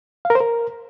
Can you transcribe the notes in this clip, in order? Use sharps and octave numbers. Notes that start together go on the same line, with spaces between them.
F5
A#4
C5
A#4